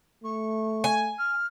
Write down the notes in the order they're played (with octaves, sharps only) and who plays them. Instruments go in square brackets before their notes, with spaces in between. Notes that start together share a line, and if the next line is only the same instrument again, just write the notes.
[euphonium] A3 [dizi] C#6
[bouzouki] G#5
[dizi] F6